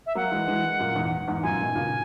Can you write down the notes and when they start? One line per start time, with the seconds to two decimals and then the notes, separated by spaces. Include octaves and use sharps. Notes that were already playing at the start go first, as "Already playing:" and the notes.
0.06 E5
0.15 F#3 A#3 F#5
0.32 E3 G#3
0.48 E3 G#3
0.79 F#2 A#2
0.95 E2 G#2
1.28 E2 G#2
1.43 F#2 A#2 G#5
1.60 G#2 B2
1.75 A#2 C#3